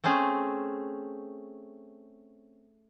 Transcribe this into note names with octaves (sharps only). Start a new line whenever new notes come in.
A3 C4 C#4 G#4